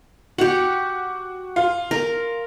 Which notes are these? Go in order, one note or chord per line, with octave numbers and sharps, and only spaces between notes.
F#4 G4 F#5
F4
A#4